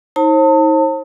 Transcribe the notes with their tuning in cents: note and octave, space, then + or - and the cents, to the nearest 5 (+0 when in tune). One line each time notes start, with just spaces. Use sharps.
D#4 +35 C5 +40 A5 +35